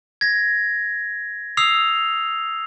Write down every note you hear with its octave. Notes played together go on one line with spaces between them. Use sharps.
G#6 A#6
D#6 E6 C7 F7